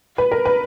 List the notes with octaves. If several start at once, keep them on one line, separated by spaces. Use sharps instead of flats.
B4
A#4
B4